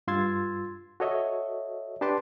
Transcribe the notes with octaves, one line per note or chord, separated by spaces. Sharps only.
G2 F4 C6 E6 G#6 A6
F#4 A4 C#5 D#5 E5
D4 G4 B4 A5 C6 D6